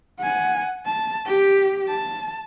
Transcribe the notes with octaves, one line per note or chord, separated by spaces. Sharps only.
F#5 G#5
A5
G4
A5